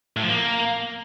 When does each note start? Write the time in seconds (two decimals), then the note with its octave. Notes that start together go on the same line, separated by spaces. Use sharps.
0.17 A2
0.23 F3
0.29 A#3